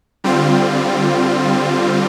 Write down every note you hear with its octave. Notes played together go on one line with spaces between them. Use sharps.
D3 G3 C4 F4